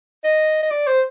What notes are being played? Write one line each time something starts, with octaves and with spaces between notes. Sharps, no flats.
D#5
D#5
D5
C5